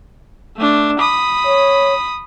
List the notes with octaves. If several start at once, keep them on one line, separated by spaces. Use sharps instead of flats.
A3 D4
B5 D#6
C#5